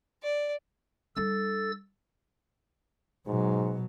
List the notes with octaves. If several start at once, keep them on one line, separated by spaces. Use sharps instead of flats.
D5
G3 D4 A4 E6 A6
G#2 B2 F#3